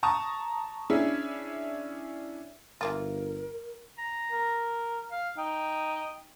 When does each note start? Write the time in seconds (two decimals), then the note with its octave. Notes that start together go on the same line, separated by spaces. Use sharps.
0.03 A5 A#5 C#6 D#6
0.90 C#4 D4 E4 G#4 E5
2.81 G1 E3 A#3 F4 A#4
3.98 A#5
4.32 A#4
5.12 F5
5.38 D#4 G5